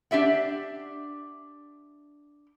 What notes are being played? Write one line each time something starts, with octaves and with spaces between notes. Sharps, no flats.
D4 G4 E5 F#5